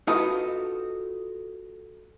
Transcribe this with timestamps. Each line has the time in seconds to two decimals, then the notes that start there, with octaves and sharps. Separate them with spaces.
0.07 D#4 F4 F#4 A4 B4 D#5